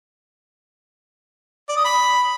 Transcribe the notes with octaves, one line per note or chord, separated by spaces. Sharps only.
D5
D#6
B5